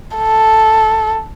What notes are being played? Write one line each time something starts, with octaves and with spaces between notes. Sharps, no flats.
A4